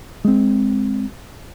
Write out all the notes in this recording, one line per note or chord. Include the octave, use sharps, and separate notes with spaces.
G#3 C4